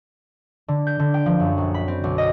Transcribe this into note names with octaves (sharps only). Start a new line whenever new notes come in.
D3
G6
D3
G5
F3
F#2
A#1
B5
C4
B1
D#5